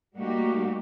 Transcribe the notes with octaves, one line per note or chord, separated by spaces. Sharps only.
G3 A3 A#3 D#4 F#4 G4